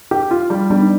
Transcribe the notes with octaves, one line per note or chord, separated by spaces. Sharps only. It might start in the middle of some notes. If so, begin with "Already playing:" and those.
G4
F4
G3
G3 B3 D4
D#4